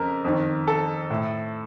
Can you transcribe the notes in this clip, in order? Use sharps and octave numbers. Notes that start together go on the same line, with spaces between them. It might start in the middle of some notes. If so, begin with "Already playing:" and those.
Already playing: F2 C#3 A#4
F2 D#3
A4
A2